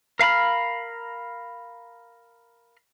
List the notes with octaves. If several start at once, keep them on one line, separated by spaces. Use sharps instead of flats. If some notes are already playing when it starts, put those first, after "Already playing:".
A#4 F5 A#5 B5 F6